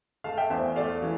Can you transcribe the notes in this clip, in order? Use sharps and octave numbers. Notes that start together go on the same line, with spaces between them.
A3 F5 A5
E5 G5
E2 C5 E5
A3 D5 F5
E3